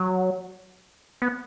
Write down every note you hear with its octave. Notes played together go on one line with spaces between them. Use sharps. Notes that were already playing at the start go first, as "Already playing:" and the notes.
Already playing: F#3
B3